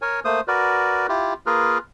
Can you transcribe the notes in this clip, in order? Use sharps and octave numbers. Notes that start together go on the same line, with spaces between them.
A#4 C#5 G#5
A3 A#3 C5 D#6
F#4 A#4 B4 D5
E4 F4 G4
A#3 F4 G#4 A#4 B4